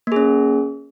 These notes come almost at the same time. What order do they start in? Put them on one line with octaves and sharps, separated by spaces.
A#3 G#4 C#4